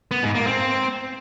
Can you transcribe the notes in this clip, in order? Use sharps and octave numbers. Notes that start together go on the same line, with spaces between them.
B3
G#2
A#3
C4